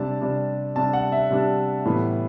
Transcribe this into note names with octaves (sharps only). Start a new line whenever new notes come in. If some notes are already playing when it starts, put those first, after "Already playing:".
Already playing: C3 G3 D4 A5
C3 G3 D4
C3 G3 D4 A5
F#5
E5
C3 G3 D4 E5
A2 E3 G3 B3